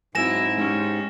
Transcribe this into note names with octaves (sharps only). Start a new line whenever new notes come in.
G#2 F#3 C4 E4 G#5 A#6 E7
G#3 C#4 D#4 G4